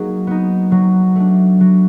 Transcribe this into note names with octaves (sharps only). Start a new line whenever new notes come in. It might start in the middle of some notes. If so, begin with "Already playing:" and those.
Already playing: F#3 A#3 D#4 G#4
B3 D#4
F#3
A3 D4
F#3